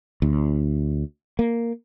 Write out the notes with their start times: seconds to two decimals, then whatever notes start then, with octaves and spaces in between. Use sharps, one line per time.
0.22 D2
1.39 A#3